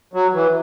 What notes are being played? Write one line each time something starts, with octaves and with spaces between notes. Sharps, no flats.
F#3
E3